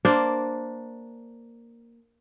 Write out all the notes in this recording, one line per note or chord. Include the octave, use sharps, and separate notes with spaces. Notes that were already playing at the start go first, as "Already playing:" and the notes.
A#3 D4 C5